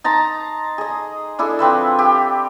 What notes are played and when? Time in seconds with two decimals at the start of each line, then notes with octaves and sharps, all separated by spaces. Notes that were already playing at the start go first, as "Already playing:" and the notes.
0.04 D#4 A5 A#5 C6
0.78 G#4 D#5
1.39 D4 E4 G#4 A4
1.59 F3 C4 B4 E5
1.99 G4